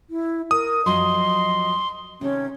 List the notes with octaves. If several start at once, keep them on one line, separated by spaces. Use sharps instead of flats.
E4
A#4 D#6
F#2 F3 F#3 D#5 C6
C3 D#3 C#4 A4